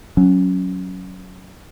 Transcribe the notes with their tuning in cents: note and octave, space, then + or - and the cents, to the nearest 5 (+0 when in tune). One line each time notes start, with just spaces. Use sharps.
F#3 +0 C#4 +0